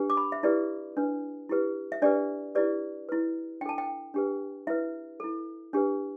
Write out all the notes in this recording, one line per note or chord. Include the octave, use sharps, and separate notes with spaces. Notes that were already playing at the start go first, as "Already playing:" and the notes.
Already playing: D4 G4 B4
D6
B5
E5
E4 G4 B4 D5
D4 B4
E4 G4 B4
E5
D4 G4 B4 D5
E4 G4 B4 D5
E4 B4
D4 A4 G5 A5
G5
D4 G4 B4
E4 B4 E5
E4 A4
D4 G4 B4